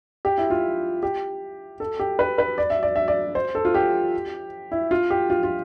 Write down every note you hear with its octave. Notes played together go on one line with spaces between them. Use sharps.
G4
E4
F4
G4
A4
G4
B4
B4
D5
E5
D5
E5
D5
C5
A4
F4
G4
E4
F4
G4
F4
F4